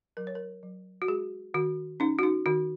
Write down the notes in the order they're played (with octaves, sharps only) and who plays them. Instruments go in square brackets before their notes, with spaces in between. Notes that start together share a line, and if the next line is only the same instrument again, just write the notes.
[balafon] F#3 A#4
C#5
A#4
F#3
F#4
G#3 G#4
D#3 F#4
C#4 D#4
F#4
D#4
D#3 F#4